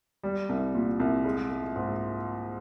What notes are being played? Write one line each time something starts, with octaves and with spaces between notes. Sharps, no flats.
G3
C2
A#2
C2
G#3
G#3
G#2